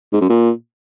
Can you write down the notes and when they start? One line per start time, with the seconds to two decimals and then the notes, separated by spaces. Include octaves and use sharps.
0.13 G#2
0.21 F#2
0.30 A#2